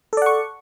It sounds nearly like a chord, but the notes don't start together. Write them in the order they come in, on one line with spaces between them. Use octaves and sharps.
A4 D5 F#5 C#6